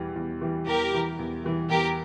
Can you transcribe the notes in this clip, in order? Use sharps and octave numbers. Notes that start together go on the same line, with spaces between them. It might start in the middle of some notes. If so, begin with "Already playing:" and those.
Already playing: E2 E3 G3
E2
E3 G3
E2 G4 A#4
E3 G3
E2
E3 G3
E2 G4 A#4